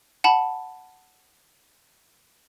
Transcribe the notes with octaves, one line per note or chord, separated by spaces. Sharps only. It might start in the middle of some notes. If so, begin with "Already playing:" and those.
F#5 A5 B5